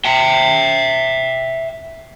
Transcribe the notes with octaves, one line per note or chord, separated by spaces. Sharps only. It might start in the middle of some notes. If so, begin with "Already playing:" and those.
E5 G5